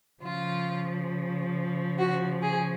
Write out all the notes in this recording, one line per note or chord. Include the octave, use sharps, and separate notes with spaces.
C#3 F3 F4
F#4
G#4